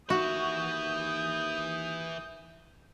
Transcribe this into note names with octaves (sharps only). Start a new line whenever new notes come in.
D#2 E3 F#4 E5 D#6 G6